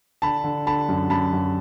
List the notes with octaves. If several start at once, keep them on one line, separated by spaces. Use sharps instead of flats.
D3 A5 B5
D3
D3 A5 B5
F#2
F#2 A5 B5
F#2